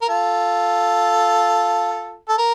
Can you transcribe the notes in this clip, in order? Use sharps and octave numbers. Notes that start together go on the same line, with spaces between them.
A#4
F4 A4
A4
A#4